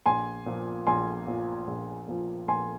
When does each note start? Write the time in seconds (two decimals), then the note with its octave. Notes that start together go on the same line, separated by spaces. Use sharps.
0.06 A#1 G#5 C6
0.46 A#2 F3
0.87 A#1 G#5 C6
1.27 A#2 F3
1.67 A#1
2.08 A#2 F3
2.48 A#1 G#5 C6